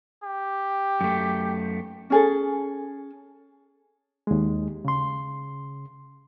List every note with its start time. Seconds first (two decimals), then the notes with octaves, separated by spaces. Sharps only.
0.24 G4
1.01 F#2 A3
2.10 C#4 G#4 A4
4.27 D#2 G#3
4.85 C#3 C6